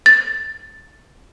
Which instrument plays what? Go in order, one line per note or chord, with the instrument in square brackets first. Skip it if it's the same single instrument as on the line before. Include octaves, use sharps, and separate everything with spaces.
[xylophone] A6